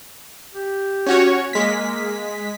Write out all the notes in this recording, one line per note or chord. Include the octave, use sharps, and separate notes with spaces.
G4
C#4 F#4 C#5
G#3 A#3 B6